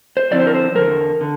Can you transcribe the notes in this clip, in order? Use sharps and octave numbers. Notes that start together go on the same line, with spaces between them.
C5
D3 F3 C4 E4 D5
C5
A#4
C5
E2 D3 G3 A#4
D3